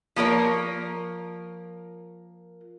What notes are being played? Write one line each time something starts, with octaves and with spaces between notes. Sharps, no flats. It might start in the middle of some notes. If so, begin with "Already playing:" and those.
F3 A#3 A#4 C#5